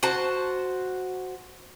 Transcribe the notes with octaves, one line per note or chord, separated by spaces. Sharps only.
F#4 C5 A5